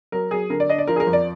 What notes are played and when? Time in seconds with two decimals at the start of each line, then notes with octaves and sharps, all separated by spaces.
0.12 F#3 A#4
0.31 F#3 G#4
0.50 D3 A#4
0.60 D5
0.69 D4 D#5
0.79 D5
0.88 F3 A#4
0.96 G#4
1.00 A#4
1.07 F2
1.13 D5